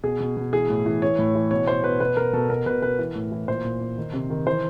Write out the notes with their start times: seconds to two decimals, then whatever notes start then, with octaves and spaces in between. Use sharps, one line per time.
0.03 B2 G#4
0.20 B2
0.37 B2
0.53 E3 G#4
0.69 A2
0.86 E3
1.02 E3 C#5
1.19 A2
1.35 E3
1.51 B2 C#5
1.67 B2 C5
1.84 B2 B4
2.00 B2 B4
2.17 B2 A#4
2.33 B2 A4
2.49 B2 A#4
2.66 B2 B4
2.82 B2 B4
2.99 E3
3.15 A2
3.32 E3
3.48 A#2 C5
3.65 A#2
3.81 A#2
3.98 D#3
4.13 C3
4.30 D#3
4.47 E3 C5